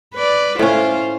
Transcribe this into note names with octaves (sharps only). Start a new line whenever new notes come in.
B4 D5
A2 C#4 F4 C5